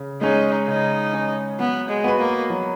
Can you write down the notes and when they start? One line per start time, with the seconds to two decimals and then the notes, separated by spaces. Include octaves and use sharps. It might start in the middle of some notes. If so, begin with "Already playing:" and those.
Already playing: C#3
0.21 G#3 C#4 D#4 G#4 C#5
0.67 C#3 D#4
1.13 G#3 C#4 G#4 C#5
1.59 F#3 B3
1.89 G#3
2.04 B3 F#4 B4
2.20 A#3
2.50 F#3